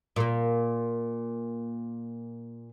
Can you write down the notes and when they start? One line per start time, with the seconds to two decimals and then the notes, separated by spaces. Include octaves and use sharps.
0.16 A#2 A#3